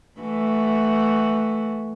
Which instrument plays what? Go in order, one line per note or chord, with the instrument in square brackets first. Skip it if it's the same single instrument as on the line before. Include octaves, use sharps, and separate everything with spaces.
[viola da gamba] E3 A3 F#4